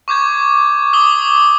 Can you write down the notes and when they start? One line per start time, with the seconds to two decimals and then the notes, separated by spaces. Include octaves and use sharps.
0.08 C#6 D6 G6 G#6
0.93 D6 D#6 G7